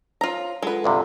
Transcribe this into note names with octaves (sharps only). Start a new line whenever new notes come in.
F4 C5 C#5 A#5
G#3 F4 A4 B4 F#5
D2 G2 C3